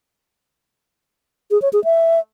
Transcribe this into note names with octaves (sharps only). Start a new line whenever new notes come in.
G#4
C#5
G#4
E5